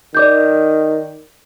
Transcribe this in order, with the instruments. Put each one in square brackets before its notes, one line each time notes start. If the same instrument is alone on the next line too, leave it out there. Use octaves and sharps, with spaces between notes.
[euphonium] D#3 [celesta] D5 D6 G6